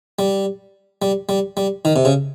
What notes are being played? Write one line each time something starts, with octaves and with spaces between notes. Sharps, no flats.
G3
G3
G3
G3
D#3
C3
C#3